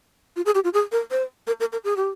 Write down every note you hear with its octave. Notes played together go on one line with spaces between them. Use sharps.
F4
G#4
G4
F4
G#4
A#4
C5
A#4
A#4
A#4
G#4
G4